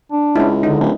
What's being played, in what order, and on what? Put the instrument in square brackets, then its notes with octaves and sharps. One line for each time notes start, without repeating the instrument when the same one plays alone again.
[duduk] D4
[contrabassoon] C#2 [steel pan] C#4 E4
[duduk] D3 [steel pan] D#4
[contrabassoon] D1